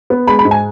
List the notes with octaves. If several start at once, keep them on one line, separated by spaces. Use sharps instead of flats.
B3
G#3 B5
B5
G#2
G#5